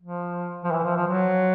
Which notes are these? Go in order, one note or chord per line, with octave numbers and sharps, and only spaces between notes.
F3
F3
E3
F3
F3
F#3